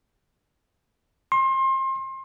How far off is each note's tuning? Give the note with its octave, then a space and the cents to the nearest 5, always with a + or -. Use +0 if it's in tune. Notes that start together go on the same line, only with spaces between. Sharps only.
C6 +30